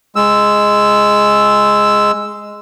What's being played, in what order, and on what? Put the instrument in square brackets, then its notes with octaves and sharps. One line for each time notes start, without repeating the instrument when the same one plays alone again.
[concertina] G#3 E6